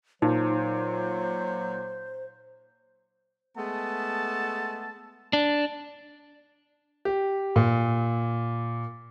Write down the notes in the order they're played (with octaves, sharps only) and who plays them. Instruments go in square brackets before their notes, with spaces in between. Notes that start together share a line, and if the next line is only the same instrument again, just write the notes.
[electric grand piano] A#2 [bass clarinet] F#3 [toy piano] D#4 [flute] C5
[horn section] G#3 A3 B3 A5
[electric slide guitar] D4
[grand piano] G4
A#2